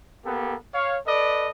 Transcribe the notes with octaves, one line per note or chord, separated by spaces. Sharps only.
A#3 B3 G4 A4
C#5 F5
A4 B4 D5 D#5